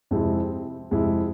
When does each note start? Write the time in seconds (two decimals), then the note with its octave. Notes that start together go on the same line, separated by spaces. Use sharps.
0.11 F2 C3 G#3 C4 E4
0.91 F2 C3 G#3 C4 E4